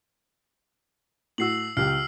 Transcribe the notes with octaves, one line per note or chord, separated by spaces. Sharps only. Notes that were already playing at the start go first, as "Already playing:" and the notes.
A2 F#4 E6 C7 F#7
C#2 G4 F6 C7